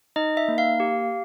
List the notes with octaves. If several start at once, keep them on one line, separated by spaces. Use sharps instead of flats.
D#4 D#5
E5
A#3
F5
G4